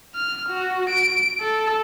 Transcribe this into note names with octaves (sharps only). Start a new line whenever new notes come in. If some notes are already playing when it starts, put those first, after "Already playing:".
F6
F#4
D7
A4